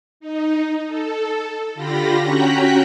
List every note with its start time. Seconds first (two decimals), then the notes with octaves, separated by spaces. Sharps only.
0.20 D#4
0.87 A4
1.75 D3 F4 G4 B5 A#6
2.21 C#4 F#4 G5 A#5 F#6 B6